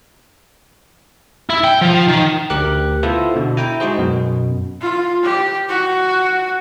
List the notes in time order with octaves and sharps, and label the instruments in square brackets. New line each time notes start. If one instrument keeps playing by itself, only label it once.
[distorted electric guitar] E4
G5
F3
D#3
[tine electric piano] D2 G4 A#4 D6 F#6
B3 E4 F4 A4 C5
B2 D3
E4 G5 A#5
G#3 D#4 F#4 G#4 C5
F#2 B2
[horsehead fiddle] F4
G4
F#4